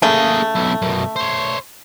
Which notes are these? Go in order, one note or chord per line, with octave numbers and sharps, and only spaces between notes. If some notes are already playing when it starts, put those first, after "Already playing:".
C#3 A3 A#3 G#4
B1 E4
F#2 B2
C5 C#5